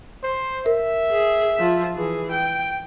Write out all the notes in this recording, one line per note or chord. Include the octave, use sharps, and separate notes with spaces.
C5
A#4 E5
G#4
F3
E3 G#4
G5